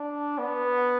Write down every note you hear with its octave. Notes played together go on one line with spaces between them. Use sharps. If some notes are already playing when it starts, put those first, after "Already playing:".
Already playing: D4
B3